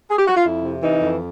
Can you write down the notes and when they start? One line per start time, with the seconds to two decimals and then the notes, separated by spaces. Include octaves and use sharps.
0.10 G#4
0.18 G4
0.27 F#4
0.36 F4
0.45 F2 E4
0.64 C3
0.83 E3 D#4
1.01 F2